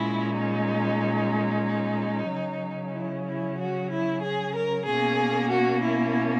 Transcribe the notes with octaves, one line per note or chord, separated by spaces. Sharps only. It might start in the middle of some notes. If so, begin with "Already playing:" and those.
Already playing: A#2 G#3 C#4 E4
D#4
D#4
C#3 F#3 C#4
E4
E4
F#4
E4
G#4
A#4
B2 A#3 C#4 G#4
F#4
E4